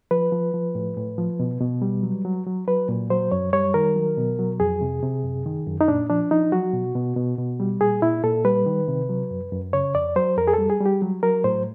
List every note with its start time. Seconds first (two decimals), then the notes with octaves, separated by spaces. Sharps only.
0.11 F3 B4
0.32 F3
0.54 F3
0.75 A2
0.97 A2
1.18 F3
1.40 B2
1.61 B2
1.82 G3
2.03 F#3
2.25 F#3
2.47 F#3
2.68 F#3 B4
2.89 A#2
3.10 F#3 C5
3.32 F#2 C#5
3.53 G3 C#5
3.74 D#3 A#4
3.96 F#3
4.17 B2
4.39 F#3
4.60 F2 G#4
4.81 C3
5.02 C3
5.24 F#2
5.46 D#3
5.67 F#2
5.81 D#4
5.88 A#2 D4
6.10 F3 D4
6.31 F3 D#4
6.52 F#3 F#4
6.74 B2
6.95 B2
7.17 B2
7.38 B2
7.60 G3
7.81 A#2 G#4
8.02 A#2 E4
8.24 A#2 A4
8.45 G3 B4
8.66 D#3
8.88 C3
9.09 F#3
9.31 F#2
9.52 F#2
9.73 C#3 C#5
9.95 F2 D5
10.16 F#3 C5
10.38 F2 A#4
10.48 G#4
10.54 A4
10.59 G3
10.70 G#4
10.80 G3
10.86 G4
11.02 F#3
11.23 F#3 A#4
11.44 A2 C5